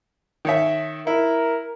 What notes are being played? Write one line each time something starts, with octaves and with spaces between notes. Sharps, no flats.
D#3 C#5 E5
E4 A#4